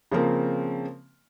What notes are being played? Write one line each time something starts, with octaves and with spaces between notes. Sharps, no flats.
C#3 F3 A#3 C4